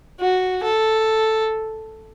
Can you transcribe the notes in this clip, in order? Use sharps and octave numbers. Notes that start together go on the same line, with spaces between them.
F#4
A4